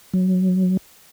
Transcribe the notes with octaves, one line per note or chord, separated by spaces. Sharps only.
F#3